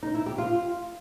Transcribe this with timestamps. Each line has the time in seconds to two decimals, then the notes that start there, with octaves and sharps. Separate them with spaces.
0.03 D#4
0.14 E4
0.26 G4
0.38 F4